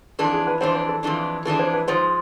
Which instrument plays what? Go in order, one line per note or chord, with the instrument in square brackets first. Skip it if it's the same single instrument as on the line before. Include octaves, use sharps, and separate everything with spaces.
[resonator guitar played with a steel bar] F2 E3 G#3 D4 [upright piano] A4
[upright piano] G#4
B4
[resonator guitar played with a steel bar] F2 E3 G#3 D4 [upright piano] C5
[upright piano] C5
A4
[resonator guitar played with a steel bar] F2 E3 G#3 D4
[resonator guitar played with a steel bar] F2 E3 G#3 D4 [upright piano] A4
[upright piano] C5
B4
[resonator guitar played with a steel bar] G#2 F3 G#3 [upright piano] C5